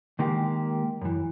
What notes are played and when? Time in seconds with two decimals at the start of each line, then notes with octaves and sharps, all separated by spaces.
0.19 D#3 G#3 A#3 G4
1.01 F#2 E3